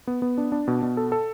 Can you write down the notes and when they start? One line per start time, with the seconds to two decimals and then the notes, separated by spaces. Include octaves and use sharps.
0.07 B3
0.22 B3
0.38 D4
0.52 D4
0.68 B2
0.83 B2
0.97 A4
1.12 A4